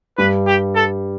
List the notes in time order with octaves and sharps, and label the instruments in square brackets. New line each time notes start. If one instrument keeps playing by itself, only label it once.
[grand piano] G2 G3 [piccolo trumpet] B4
[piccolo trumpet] G4
A4